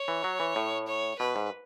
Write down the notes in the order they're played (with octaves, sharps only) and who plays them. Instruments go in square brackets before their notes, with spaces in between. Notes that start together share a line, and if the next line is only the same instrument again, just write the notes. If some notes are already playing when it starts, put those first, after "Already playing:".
Already playing: [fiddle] C#5
[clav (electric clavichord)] E3
F#3
E3
A2
[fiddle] C#5
[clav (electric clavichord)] B2 [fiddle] B4
[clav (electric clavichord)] G#2